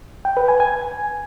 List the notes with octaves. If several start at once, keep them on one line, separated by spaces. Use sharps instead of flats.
G5
B4
G#5
G#5